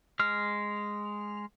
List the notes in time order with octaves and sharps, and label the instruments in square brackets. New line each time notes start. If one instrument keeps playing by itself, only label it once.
[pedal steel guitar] G#3 F6